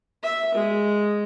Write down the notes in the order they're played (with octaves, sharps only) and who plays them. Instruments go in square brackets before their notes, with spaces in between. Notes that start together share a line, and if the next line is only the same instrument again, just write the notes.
[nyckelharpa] E5
G#3